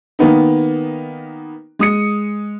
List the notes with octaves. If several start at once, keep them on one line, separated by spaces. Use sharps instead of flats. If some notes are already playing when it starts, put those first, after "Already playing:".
D#3 A#3 B3 D#4
G#3 D#6 C#7